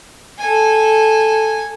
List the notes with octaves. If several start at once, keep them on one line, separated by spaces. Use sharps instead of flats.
A4 G#5